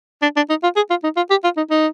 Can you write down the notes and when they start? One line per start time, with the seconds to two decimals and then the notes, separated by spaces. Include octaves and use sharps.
0.22 D4
0.36 D4
0.50 D#4
0.63 F4
0.76 G#4
0.90 F4
1.04 D#4
1.17 F4
1.31 G4
1.44 F4
1.57 D#4
1.71 D#4